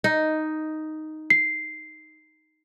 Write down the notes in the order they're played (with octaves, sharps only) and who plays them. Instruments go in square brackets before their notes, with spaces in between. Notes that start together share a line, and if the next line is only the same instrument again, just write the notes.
[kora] D#4
[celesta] C7